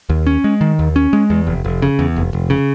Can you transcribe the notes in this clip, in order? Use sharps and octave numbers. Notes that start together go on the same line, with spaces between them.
D#2
C#4
G#3
D#3
D#2
C#4
G#3
E2
F1
F1
C#3
E2
F1
F1
C#3